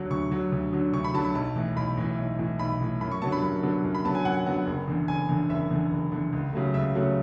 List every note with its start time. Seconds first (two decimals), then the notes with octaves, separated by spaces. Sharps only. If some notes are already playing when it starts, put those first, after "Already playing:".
Already playing: D2 D3 F#3
0.10 D2 C#6
0.31 D3 F#3
0.52 D2
0.73 D3 F#3
0.93 D2 C#6
1.04 B5
1.14 D3 F#3 A5
1.25 B5
1.35 B1 A5
1.56 A2 E3
1.76 B1 B5
1.97 A2 E3
2.18 B1
2.39 A2 E3
2.59 B1 B5
2.81 A2 E3
3.01 F#2 B5
3.12 C#6
3.22 D3 F#3 B3 A5
3.32 B5
3.43 F#2
3.63 D3 F#3 B3
3.84 F#2
3.95 B5
4.05 D3 F#3 B3 A5
4.15 G#5
4.25 F#2 F#5
4.46 D3 F#3 B3 F#5
4.67 F#1
4.88 E2 D3
5.08 F#1 G#5
5.29 E2 D3
5.49 F#1 E5
5.71 E2 D3
5.91 F#1
6.12 E2 D3
6.33 C#2
6.53 C#3 F#3 A3
6.74 C#2 E5
6.95 C#3 F#3 A3